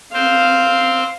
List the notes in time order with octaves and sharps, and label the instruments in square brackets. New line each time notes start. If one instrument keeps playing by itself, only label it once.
[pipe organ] C4 C5 [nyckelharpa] F5